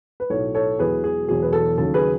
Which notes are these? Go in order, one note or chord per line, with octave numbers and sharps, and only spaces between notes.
B4
B1 A2 F#3 A4 C#5
A4 C#5
E1 E2 B2 F#3 G#4 B4
G#4
E1 E2 B2 F#3 G#4
B4
A4
D#2 C#3 F#3 A4
G#4 B4